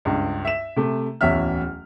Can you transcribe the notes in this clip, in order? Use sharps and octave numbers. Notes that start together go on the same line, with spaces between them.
C#2 G2
E5 E7
C3 A3
D1 E2 C#4 E5 F6